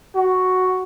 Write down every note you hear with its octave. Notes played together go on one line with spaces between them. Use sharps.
F#4